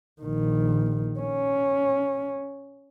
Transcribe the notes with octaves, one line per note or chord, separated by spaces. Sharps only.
A#1 D#3
C#4